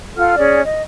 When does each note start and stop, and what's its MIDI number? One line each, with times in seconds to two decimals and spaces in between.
0.16 0.36 65
0.16 0.36 69
0.16 0.36 78
0.16 0.36 89
0.37 0.61 61
0.37 0.61 68
0.37 0.61 74
0.64 0.83 75